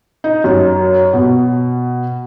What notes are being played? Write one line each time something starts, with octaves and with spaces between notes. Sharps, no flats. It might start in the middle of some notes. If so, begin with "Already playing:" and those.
D#4
F#2
B2